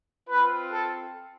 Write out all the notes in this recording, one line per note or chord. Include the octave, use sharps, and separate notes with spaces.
C4 F4 B4
A4